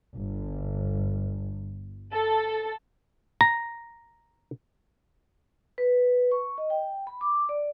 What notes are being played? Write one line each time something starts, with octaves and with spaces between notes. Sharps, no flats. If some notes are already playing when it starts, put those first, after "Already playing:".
G1
A4
A#5
B4
C#6
D#5
G5
B5
D6
D5